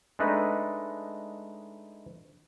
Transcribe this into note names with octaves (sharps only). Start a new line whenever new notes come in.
G#3 A3 D4 D#4 B4